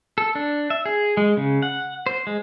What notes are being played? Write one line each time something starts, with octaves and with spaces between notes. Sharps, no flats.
A4
D4
E5
G#4
G#3
C#3
F#5
C5
G#3